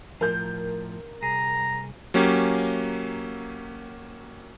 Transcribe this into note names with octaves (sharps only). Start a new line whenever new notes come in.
A2 F3 A#4 G6
C2 G#4 A#5
F#3 A#3 C#4 G4